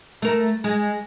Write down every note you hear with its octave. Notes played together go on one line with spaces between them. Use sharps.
A3 A#4
G#3